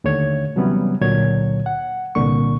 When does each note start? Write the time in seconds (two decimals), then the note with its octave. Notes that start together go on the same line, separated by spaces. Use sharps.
0.04 D#2 D3 A3 C#5 G#6
0.56 C3 E3 F#3 G3 B3 C#4
1.01 C#2 A#2 D3 F#3 C#5 G#6
1.66 F#5
2.15 C2 A#2 D3 A#3 C#6